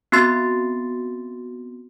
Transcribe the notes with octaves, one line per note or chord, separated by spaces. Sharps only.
B3 C4 F#4 C6 A6 C7